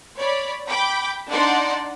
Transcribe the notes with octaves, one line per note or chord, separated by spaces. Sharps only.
C#5 D5 B5
G5 B5 D6
D4 D#4 D5 F#5 C6